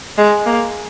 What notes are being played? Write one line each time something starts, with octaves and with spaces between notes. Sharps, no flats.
G#3
A#3